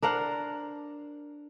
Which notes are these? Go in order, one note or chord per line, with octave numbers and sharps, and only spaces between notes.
D4 A#4 C5 F#5